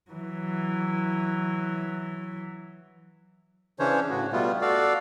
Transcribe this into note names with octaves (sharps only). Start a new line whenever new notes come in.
E3 F#3
C#3 E3 C#4 D4 C5 C#5
A2 C#3 F#4
B2 G3 A3 B3 F4
F#4 A4 D5 F5